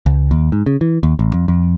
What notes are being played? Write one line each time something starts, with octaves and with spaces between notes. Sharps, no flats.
C#2
D#2
G#2
C#3
E3
D#2
A1
F2
F2